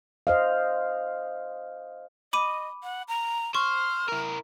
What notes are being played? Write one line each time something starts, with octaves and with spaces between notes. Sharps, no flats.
C5 D#5 F5
D#5 B5 D6 D#7
F#5
A#5
C5 C#6 F6
E4 A#4